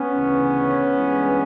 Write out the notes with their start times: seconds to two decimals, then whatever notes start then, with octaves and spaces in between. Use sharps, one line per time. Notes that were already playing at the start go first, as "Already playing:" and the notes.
Already playing: B3 C#4
0.13 D2 C#3 E3
0.96 G2 E3 G#3